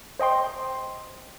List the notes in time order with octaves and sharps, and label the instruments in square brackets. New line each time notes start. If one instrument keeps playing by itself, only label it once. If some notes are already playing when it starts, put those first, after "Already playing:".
[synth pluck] C5 D#5 G5 C6